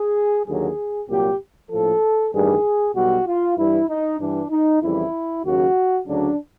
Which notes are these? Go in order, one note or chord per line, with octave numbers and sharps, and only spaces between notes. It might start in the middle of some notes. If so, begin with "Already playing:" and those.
Already playing: G#4
D#2 D3 F#3 G#4
C2 A#2 F#3 G4
A#1 A2 F3 A4
A1 G2 D#3 G3 G#4
B1 B2 G3 F#4
F4
G2 E3 G3 E4
D#4
G2 E3 G3 D4
D#4
F2 C#3 E3 G3 E4
D#2 C#3 F#3 F#4
D2 C#3 F#3 D4